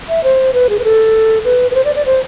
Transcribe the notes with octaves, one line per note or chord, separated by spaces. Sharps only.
E5
C5
B4
G#4
B4
A4
B4
B4
C5
D5
D5
C5